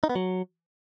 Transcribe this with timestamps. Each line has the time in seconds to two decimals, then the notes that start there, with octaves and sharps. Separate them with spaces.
0.04 D#4
0.10 B3
0.15 F#3